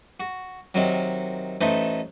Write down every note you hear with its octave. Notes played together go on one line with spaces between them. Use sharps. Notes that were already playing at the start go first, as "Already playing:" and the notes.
F#4
C3 D#3 F#3
A1 A3 D#4 A4 B4 C5